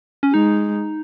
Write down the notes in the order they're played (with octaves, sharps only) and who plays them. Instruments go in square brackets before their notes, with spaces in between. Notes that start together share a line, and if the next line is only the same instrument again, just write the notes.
[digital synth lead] C#4
[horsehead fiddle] G#3 [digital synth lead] D#4